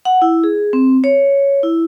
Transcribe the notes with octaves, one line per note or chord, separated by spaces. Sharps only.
F#5
E4
G#4
C4
C#5
E4